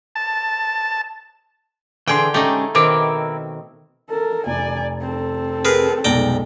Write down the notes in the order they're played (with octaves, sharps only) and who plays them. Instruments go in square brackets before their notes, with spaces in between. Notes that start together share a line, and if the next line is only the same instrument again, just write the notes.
[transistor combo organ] A5
[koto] D3 G5 [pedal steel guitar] E3 G#4 C6
[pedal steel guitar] G#3 C#4 G4 [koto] A3 D#4
[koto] B2 D#3 C4 [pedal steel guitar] E4 A#4 D6
[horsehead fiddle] A4 A#4
[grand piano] F1 [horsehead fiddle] D5 G#5
[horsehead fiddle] C4 A4
[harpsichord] G#4 A#4 B4
[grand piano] F1 B1 G#3 [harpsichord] D5 G5 A#5